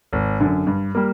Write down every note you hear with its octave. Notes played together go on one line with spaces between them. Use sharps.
G#1
F#2 D3
G2
G3 A#3